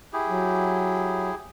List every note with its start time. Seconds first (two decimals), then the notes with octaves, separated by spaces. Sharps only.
0.13 E4 G4 G#4
0.29 F#3